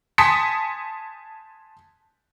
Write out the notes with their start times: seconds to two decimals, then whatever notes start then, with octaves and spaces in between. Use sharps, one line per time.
0.18 G#5 A5 C6 D#6 B6 C#7